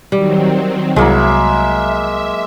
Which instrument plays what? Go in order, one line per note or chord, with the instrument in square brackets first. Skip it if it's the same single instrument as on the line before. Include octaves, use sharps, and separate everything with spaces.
[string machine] D#3 F#3 C4 [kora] G3
[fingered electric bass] C2 [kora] F#3 E4 [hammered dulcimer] G#3 A#3 [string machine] E5